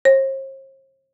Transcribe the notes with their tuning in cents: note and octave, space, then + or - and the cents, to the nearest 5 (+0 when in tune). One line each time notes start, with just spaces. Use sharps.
C5 +45